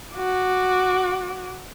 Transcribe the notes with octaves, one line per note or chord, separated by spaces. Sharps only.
F#4 D6